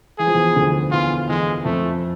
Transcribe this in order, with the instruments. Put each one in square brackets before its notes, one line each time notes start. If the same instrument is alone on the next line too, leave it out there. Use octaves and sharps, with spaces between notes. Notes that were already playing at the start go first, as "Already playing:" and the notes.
[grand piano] E3 [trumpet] G#4
[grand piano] F3
E2 E3
D2 D3
[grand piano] E2 E3 [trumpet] F4
[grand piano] E2 E3 [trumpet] G#3
[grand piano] F2 F3 [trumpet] A3